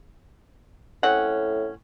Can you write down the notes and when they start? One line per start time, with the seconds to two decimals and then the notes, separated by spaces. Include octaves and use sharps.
1.03 A2 C4 C#4 F#5